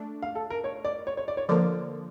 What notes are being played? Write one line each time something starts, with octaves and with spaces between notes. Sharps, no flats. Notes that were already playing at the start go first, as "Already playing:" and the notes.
Already playing: A3 D4
F5
A4
A#4
C#5
D5
C#5
C#5
D5
C#5
D3 F3 A#3 D5